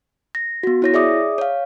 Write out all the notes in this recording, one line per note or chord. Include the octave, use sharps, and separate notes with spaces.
A#6
B3 F#4
E4 C#5 A#6
G#4 D5 E5 D6 D#6
C#5 F5